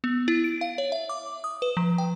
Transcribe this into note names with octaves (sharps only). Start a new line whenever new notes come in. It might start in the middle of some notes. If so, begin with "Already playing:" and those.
B3
E4
D7
F5
C#5
E5
D6
D#6
B4
F3
G5